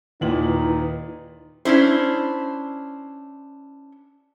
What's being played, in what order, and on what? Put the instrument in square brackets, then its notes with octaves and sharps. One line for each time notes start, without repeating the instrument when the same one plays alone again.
[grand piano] D#2 A#2 F#7 [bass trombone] D#4 [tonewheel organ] E4 B4
[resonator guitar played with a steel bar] C#4 D4 E4 C5